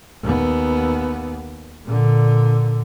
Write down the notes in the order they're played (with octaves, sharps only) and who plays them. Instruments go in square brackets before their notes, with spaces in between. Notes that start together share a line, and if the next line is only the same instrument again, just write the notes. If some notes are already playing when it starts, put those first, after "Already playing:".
[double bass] D#2 B3
A#2 D3